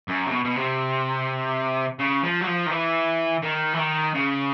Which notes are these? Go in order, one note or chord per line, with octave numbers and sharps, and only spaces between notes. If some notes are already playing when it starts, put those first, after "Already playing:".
F#2
C3
B2
B2
C3
C#3
F3
F#3
F3
D#3
E3
D#3
E3
D#3
C#3